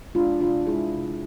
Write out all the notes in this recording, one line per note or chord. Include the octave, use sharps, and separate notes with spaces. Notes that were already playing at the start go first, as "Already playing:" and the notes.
G#3 D4 F4
C3 D4 F4
G#3 E4 G#4
C3